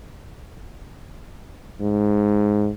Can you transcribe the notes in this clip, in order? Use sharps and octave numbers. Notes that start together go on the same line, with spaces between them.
G#2